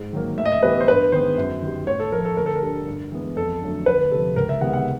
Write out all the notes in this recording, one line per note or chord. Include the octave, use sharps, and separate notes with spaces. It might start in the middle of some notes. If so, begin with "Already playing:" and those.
Already playing: G#2
D#3 F#3 A#3
A2 E5
D#5
E5
E3 G3 B3 B4
C5
G2 B4
D#3 G#3 B3 C5
F#2
D#3 G3
A2 C#5
A4
F3 A3 A#4
A4
D2 A#4
A4
A#4
D3 G3
G2
E3 G#3 B3
F2 A4
D3 F#3 A3
D2 B4
C3 F3 A4
C#2 A#4
E5
C3 D#3 G#3 B3 F#5
F#5